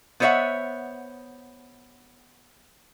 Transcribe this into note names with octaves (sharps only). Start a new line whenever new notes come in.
B3 C5 C#5 D#5 E5 F#5